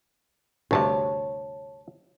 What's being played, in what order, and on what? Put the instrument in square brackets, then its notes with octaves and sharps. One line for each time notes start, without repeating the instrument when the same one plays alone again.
[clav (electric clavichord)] D2 G2 C3 [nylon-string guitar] C#5 A5